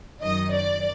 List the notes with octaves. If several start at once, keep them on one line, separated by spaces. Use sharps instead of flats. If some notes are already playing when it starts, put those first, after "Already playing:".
F#2 D#3 F#3 D#5
D5